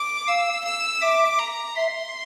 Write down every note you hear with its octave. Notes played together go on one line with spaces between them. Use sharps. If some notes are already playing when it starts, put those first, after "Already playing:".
Already playing: D6
F5 E6
E6
E5 D6
A#5
E5 C6